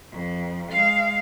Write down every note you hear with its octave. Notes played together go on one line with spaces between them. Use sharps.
F2
G#3 F5